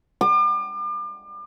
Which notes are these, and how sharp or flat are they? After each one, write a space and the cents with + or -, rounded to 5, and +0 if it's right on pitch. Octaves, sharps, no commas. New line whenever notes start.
D6 +40